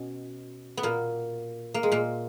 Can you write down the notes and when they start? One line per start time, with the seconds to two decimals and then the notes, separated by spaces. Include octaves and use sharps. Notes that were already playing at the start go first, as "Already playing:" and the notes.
Already playing: B2 C#4
0.77 B3
0.83 A#2 A#3
1.74 A#3
1.83 G#3
1.92 A#2 A#3